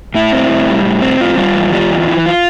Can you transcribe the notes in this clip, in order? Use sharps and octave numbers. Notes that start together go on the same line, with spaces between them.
A2 E4
C4
A2
G3
A2
C4
A2 F4
G3 F4
E2
G3
E2
E3
F4